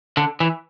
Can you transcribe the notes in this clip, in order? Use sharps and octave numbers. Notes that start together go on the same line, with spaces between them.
D3
E3